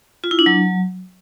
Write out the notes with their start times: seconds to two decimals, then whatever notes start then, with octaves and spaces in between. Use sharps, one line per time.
0.24 F4
0.31 E4
0.39 D4
0.46 F#3